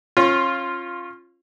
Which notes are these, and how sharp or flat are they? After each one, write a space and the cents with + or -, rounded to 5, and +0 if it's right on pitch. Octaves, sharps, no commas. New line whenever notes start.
C#4 -30 F4 +0